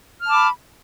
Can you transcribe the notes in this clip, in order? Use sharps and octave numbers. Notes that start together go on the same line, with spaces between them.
A5 B5 D6 F6